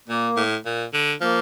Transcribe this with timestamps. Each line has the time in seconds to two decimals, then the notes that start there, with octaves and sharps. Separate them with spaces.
0.08 A#2 A#3
0.36 A2
0.65 A#2
0.93 D3
1.21 F3 A#3